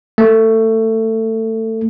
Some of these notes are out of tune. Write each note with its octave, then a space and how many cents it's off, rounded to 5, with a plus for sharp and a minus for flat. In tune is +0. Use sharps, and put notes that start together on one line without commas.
A3 +20